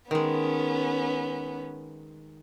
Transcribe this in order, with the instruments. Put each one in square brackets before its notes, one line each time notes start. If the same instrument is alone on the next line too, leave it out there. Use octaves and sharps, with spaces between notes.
[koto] D#3 G#3 [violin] B3 C#4